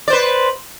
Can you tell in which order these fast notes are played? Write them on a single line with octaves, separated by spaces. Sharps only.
D5 C5 B4